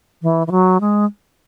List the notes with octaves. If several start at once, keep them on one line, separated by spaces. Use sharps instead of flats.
E3
E3
F#3
G#3